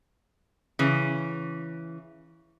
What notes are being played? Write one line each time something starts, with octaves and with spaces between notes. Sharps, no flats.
C#3 E3